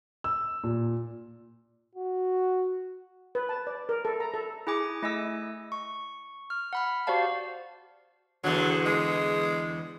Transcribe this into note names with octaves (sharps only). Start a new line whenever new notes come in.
E6
A#2
F#4
B4
A5
D5
A#4
A4
A#5
A4
E4 G#4 G#5 D6
A3 E4 D#5 G#5 E6
C#6
F6
F#5 B5 F6
F#4 G4 C5 D5 F5 A5
E2 D3 F#3
G#3